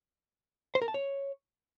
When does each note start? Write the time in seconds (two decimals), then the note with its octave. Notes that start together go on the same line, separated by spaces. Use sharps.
0.75 C5
0.82 A#4
0.88 A5
0.94 C#5